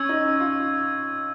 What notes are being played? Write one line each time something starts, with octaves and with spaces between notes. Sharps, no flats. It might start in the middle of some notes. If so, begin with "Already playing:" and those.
Already playing: C#4 C#6 E6 G#6
D#4
F4